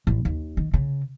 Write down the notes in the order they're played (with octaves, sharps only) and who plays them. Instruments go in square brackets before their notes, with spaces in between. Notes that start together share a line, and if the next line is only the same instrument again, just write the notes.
[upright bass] A1
D#2
D#3
C#3